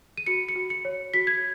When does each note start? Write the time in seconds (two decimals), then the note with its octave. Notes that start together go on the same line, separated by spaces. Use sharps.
0.17 D#7
0.26 F#4 C#7
0.49 C#7
0.56 F#4
0.70 C#7
0.85 C#5
1.14 F#4 B6
1.27 G#6